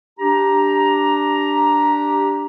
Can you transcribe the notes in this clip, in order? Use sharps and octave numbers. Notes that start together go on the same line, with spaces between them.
D4 G4 A#5